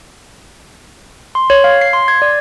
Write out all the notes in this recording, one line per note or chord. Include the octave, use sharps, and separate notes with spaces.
C6
C#5
F5
C7
C6
G#6
D5